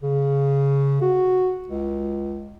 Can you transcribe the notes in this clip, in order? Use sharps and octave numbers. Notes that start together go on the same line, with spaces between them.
C#3
F#4
C#2